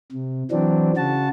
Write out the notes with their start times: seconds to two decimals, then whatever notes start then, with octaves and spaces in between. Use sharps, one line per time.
0.12 C3
0.51 E3 F#3 C4 D4
0.97 C#3 F#4 A5